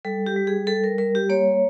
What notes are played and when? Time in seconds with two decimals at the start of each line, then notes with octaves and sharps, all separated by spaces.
0.05 G3 A4
0.26 G4
0.37 G3
0.47 G#4
0.67 G3 A4
0.84 A#4
0.98 G3 A#4
1.15 G4
1.29 A#3 C#5